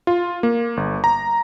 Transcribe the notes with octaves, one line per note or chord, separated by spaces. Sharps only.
F4
A#3
G1
A#5